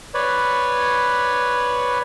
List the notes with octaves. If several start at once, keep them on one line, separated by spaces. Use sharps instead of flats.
B4 C#5 D5